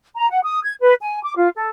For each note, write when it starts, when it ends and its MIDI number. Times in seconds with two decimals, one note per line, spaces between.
0.16 0.29 82
0.29 0.39 78
0.44 0.60 87
0.63 0.74 92
0.81 0.94 71
1.01 1.22 80
1.24 1.33 86
1.36 1.49 65
1.56 1.70 69